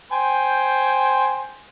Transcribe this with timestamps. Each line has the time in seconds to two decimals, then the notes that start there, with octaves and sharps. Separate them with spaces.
0.12 C5 G5 G#5